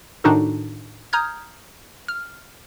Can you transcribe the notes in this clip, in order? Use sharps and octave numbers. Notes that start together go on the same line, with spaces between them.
A2 D#3 D4 D#4 F#4 A4
A#5 D#6 F6 G6 G#6
F6